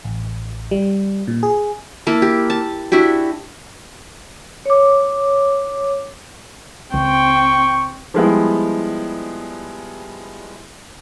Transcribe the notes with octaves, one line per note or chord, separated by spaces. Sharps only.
A1
G3
A#2
G#4
A#3 E4 A5
G4
A5
D4 E4 F#4 G4
C#5 D6
C#2 C4 G5 C#6
F3 G3 G#3 B3 E4